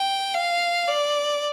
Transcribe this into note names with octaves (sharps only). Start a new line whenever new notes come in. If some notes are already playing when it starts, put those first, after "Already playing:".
Already playing: G5
F5
D5